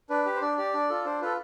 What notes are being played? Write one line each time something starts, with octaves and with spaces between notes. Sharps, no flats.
D4 B4
G4
C5
D4 D5
G4 D5
D4
F4 A4
D4 C5
F4 A4 B4